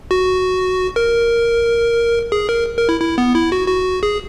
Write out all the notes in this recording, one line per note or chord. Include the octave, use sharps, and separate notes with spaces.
F#4
A#4
G#4
A#4
A#4
E4
E4
B3
E4
F#4
F#4
G#4